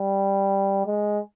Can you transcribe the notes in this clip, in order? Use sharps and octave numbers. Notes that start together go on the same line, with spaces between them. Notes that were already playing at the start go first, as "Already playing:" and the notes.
Already playing: G3
G#3